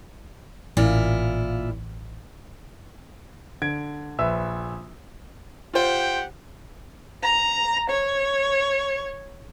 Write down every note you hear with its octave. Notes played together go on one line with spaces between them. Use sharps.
A1 A#2 E4 F4
D3 G#6 D7
A#1 B4 E5 E6
F4 G4 C5 F#5 G5
A#5
C#5